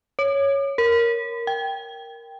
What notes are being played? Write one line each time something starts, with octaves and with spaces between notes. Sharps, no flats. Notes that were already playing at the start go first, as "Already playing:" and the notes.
C#5
A#4
G5